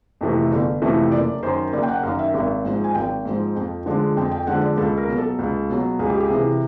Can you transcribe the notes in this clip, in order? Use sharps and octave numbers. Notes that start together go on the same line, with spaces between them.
F2 C3 E3 A3
G1
F2 C3 E3 A3
F#1 D5
F#2 D#3 C5
F#1 D5
G5
F#5
F#2 D#3 F5
E5
G#1
G#2 F3
G#5
G#1 G5
G#2 F3
F2
D3 F3 G#3
F2 G5
G5
D3 F3 G#3 F#5
D5
C#2 A4
A#4
B2 F#3
A4
C#2
B2 F#3
C#2 G#4
G4
G#4
C3 E3